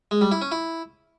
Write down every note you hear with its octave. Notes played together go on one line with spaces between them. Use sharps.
G#3
G3
E4
C#4
E4